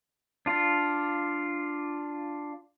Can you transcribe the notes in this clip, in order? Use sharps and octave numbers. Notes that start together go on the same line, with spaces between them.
D4 F4